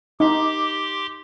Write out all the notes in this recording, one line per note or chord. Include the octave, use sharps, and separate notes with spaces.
D#4 G4 C6 D6